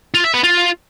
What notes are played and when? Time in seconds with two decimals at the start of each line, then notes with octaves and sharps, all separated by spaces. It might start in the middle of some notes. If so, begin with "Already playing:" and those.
0.14 F4
0.24 E5
0.34 B3
0.44 F4